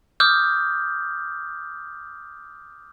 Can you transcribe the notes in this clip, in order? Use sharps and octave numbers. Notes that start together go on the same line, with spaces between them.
D6 D#6 F6 G6